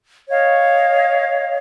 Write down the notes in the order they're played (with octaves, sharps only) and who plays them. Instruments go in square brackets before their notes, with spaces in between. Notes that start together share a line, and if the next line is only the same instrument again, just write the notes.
[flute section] C#5 D#5 F5